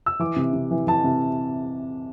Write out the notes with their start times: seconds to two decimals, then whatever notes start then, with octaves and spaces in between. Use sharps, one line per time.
0.06 E6
0.19 E3 D6
0.36 C3
0.53 C3
0.71 E3
0.87 E3 A5
1.04 C3